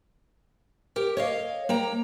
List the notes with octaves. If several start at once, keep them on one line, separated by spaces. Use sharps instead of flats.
G4 A#4
C#5 D#5 F5
A#3 G5 A#5